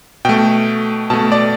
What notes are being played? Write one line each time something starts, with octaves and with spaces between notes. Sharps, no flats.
B2 A3 G5
B2 A3 A5
D5